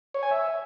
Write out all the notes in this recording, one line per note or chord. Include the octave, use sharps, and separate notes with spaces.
C#5
G#5
E5